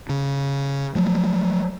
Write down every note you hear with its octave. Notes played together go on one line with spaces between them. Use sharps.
C#3
F3 F#3 A3